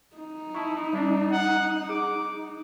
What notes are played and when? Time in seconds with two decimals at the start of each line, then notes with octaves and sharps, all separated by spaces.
0.17 D#4
0.55 E4 A5 C#6
0.93 G3 C#4 D4
1.31 F#5
1.89 G#4 D6